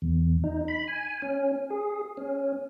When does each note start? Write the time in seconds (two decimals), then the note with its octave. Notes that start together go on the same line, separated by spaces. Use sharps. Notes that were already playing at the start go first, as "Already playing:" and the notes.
0.02 E2
0.44 D#4
0.68 B5
0.88 G#5
1.22 C#4
1.70 G#4
2.17 C#4